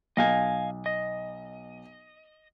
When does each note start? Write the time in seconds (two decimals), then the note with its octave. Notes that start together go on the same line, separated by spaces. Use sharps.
0.17 B1 D#5 F5 G#5
0.86 D#5